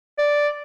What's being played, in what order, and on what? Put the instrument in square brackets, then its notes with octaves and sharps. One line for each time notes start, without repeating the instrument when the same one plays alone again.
[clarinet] D5